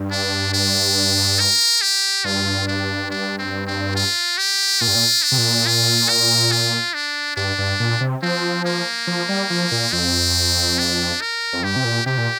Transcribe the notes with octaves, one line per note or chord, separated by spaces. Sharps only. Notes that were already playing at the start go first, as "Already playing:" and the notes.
Already playing: G2
D4
D4
A#4
G4
G2 F4
D4
D4
C4
C4
F4
G4
A#2 F4
G2
A#2
D4
C3
A#2
F4
A#4
F4
D4
G2 D4
G2
A#2
C3
F3 C4
A#3
F3
G3
F3
A#2
F2 C4
D4
A#4
F2
G2 G4
C3
A#2
C3 G4
A#2